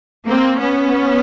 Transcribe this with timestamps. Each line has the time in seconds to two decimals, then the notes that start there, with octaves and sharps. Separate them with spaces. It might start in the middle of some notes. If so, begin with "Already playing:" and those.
0.28 A#3 C4
0.60 B3 C#4